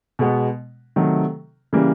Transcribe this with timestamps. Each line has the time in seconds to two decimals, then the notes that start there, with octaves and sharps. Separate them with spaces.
0.19 B2 G#3 B3
0.96 C3 D#3 F#3 A3
1.73 C#3 E3 G3 A#3